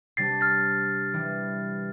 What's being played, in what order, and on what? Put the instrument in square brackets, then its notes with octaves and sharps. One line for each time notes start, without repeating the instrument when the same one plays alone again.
[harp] C3 G3 D4 G4 [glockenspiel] A6 C7
[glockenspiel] F6 A6
[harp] E3 G3